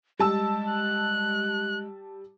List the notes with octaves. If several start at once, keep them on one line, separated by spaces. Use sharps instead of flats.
G3 G#3 A5 E6
F#6